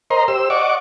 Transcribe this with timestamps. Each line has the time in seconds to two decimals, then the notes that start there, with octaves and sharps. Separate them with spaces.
0.10 A#4 C5 D#5 A#5 C6
0.28 G4 C5 E6
0.50 D5 D#5 F#5 C#6 D6